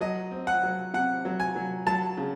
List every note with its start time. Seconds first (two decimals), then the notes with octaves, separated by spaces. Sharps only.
0.01 F#3 D#5
0.31 C4
0.47 F#5
0.63 F#3
0.94 C3 F#5
1.25 F#3
1.40 G#5
1.55 F#3
1.87 F#3 A5
2.17 C#3